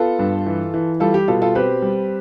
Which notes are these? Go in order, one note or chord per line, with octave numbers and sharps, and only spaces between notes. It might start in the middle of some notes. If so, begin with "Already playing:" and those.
Already playing: B3 F4 A4
G2
E3
E3
G3 F4 A4
G4
B2 F4 A4
F4 A4
C4 G4 B4
G3